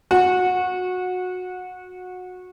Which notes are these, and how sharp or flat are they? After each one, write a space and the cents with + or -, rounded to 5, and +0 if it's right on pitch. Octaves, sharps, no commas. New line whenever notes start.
F#4 -20